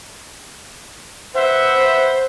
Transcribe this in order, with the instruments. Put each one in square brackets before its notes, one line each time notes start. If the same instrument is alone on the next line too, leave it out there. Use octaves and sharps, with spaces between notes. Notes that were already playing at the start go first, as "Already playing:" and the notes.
[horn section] B4 E5 F#5 [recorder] C5